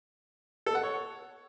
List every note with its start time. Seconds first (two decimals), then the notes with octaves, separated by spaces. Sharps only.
0.66 A4
0.75 F#5
0.83 C#5